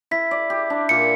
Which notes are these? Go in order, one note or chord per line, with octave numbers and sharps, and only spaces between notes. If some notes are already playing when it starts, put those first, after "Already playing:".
E4 B6
D5
G4
D4
A#2 C#7